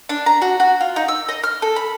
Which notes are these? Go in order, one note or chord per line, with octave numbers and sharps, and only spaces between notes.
D4
A#5
F#4
F#4
F4
D#4
E6
D#5
F6
A4
B5